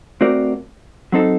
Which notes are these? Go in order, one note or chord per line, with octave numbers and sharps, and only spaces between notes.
A3 C4 F#4 A#4 D5
F#3 C4 D#4 A4